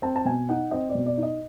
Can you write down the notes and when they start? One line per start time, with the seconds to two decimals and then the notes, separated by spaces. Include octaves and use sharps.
0.02 C4 A5
0.16 A5
0.25 B2 G#5
0.49 D#4 F#5
0.71 C4 D#5
0.89 D5
0.95 B2
1.06 D5
1.17 D#4
1.23 D#5